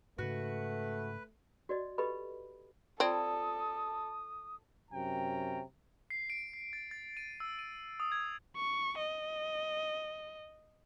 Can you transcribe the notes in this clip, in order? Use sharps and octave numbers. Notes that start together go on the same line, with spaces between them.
G#2 C#3 A3 F#4 B4
F#4 D5 D#5
G4 A4 B4 D#5 B5
C4 F4 A4 D5 A5 D#6
F#2 C3 C#4 G5 A#5
C7
D7
C7
A6
A6
D#7
E6
D#7
D#6
G#6
C#6
D#5